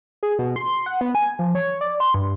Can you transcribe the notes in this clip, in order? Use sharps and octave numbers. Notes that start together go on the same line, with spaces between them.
G#4
B2
C6
F#5
B3
G#5
F3
C#5
D5
C6
G2